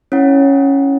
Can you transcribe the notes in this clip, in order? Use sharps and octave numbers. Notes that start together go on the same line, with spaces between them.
C#4 E4 C#5 F#5